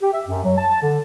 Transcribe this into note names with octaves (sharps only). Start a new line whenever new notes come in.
G4
E5
F#2
F#3
A5
D3